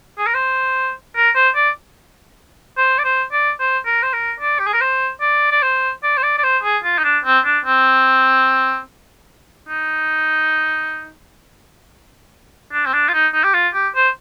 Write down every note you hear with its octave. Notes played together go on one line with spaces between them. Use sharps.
G#4
A#4
C5
A#4
C5
D5
C5
D5
C5
D5
C5
A#4
C5
A#4
D5
G4
G#4
A#4
C5
D5
D5
C5
D5
C5
D5
D5
C5
G#4
F4
D#4
D4
C4
D4
C4
D#4
D4
C4
D4
F4
D#4
D#4
G4
F4
G4
C5